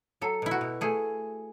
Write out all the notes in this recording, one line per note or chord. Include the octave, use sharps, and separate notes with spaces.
F#3 A4
B2 E4
F#4
B2
A3 G#4